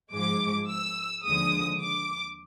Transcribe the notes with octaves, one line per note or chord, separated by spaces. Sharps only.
G#2 F3 G#3 D6
E6
D#2 D3 F3 G#3 D#6
D6